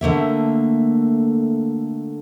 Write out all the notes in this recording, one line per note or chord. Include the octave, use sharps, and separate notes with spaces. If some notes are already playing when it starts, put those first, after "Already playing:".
D3 A3 A#3 E5